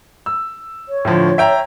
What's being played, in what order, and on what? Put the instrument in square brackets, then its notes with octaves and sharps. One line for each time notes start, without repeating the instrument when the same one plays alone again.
[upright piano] E6
[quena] C#5
[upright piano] A2 D3 F3
E5 G5 A#5